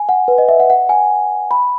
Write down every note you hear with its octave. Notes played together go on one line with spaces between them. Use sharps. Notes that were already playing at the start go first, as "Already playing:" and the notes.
Already playing: G#5
F#5
B4
D#5
E5
F#5
F#5
G#5
B5